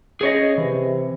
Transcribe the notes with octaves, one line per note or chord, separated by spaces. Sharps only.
C#4 G#4 C#5 D#5
C3 E3